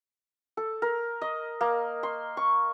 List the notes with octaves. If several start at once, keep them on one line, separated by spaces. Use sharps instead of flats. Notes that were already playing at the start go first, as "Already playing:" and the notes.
A4
A#4
D#5
A#3
C6
C#6